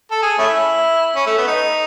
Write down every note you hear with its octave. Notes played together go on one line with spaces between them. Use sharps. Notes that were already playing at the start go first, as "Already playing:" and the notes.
A4
G#4
A3 C#4 E4
C#4
A3
B3
D#4